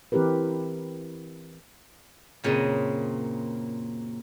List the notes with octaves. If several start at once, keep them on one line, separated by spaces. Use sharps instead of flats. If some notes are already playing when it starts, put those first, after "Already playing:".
E3 C4 E4 G4 A#4 B4
F#2 A#2 C#3 C4 D#5